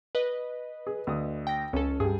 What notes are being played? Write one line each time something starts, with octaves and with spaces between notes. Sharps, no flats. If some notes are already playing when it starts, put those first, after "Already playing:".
B4 D#5
G#4
D2 D#6
G5 A#6
C#2 C#4 A4
G2 G3 G#4